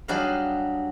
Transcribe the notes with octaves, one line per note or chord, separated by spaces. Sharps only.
F#3 G3 D4 G#4 D#5 F5